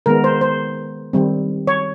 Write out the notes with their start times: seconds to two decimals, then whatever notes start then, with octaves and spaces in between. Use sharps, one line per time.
0.06 D#3 G#3 B3 A#4
0.24 C5
0.41 C5
1.13 D#3 G3 C4
1.67 C#5